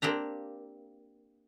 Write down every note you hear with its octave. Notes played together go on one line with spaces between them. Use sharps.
A#3 C4 D4 G4 A#5